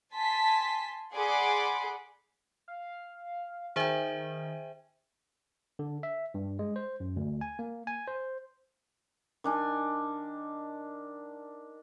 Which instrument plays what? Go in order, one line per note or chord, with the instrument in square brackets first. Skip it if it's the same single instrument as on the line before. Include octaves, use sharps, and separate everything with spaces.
[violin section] G#5 A5 C6 B6
G#4 D5 F#5 B5 C6 D6
[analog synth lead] F5
[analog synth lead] D#3 [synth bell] G#4 C5 E5 [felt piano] G5 G#5
[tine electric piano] D3
E5
G2
G#3
C5
F#2
D2
G#5
A#3
G#5
C5
[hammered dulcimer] D#3 D4 G#5